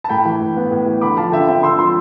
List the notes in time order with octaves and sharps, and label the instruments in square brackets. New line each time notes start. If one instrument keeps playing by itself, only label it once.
[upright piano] A5
A2 G5 B5
E3
A2
B3
A2
E3
D3 B5 D6
F3 F5 A5
D3 E5 G5
C4 E5 G5
D3 C6 E6
F3 C6 E6